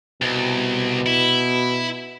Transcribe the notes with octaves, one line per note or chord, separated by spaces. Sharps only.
C2 B2
E4